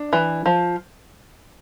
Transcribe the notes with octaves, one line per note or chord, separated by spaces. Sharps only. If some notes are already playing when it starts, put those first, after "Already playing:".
Already playing: D4
E3
F3